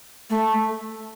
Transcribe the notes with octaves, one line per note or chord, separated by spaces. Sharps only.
A3